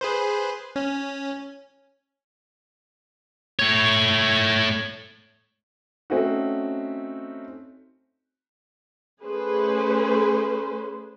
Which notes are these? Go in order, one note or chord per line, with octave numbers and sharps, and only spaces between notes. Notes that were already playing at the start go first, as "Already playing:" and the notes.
G#4 B4 C5
C#4
A3 C#5
A3 C4 C#4 D#4 F#4
A3 C#4 G#4 B4 C5